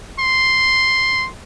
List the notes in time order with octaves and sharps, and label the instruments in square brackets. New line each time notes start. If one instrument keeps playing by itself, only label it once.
[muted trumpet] C6